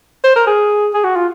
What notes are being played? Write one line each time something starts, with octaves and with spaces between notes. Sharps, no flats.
C5
A#4
G#4
G#4
F#4
F4